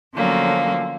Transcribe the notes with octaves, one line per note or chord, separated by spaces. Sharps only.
D3 F3 F#3 A3 A#3 C#4